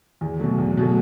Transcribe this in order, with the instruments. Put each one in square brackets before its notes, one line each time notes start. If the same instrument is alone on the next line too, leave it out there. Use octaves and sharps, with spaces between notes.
[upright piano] E2
B2 F#3 A3
E2
B2 F#3 A3